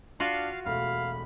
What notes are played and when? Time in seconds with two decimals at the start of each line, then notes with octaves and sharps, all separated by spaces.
0.20 D4 F4 F#4 F5
0.65 E1 A3 F5 B5 F6